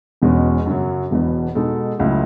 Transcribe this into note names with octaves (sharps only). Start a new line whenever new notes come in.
E1 E2 B2 G#3 C#4
F#2 C#3 F#3
E1 E2 B2
B2 G#3 D#4 A4
C#2 C#3 F#3 A3 E4